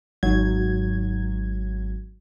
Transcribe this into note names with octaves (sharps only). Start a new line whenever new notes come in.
G#1 F#3 G#6